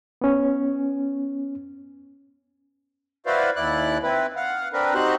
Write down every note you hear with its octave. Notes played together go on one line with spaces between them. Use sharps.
B3 C#4
E4 F#4 B4 C5 D5 F5
D#2 E4 D5 F#6
C4 E4 B4
F5 F#5
C4 D4 A#4 B4
C4 D#4 F#4 G4 C5 F#6